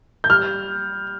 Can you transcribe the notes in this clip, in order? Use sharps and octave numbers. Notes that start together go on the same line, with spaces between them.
G6
G3 F6